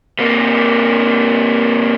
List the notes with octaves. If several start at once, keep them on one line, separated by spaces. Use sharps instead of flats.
C3 A#3